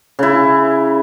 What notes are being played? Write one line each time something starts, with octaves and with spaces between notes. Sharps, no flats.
C#3 E4